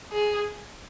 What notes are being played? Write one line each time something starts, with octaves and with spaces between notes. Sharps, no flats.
G#4